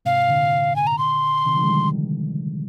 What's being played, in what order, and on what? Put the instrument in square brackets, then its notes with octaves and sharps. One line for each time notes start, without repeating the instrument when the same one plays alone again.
[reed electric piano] G#2 C3 [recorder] F5
[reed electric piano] A#2 D3
[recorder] G#5
A#5
C6
[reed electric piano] C3 D#3
D3 F3
G#3
D#3 G3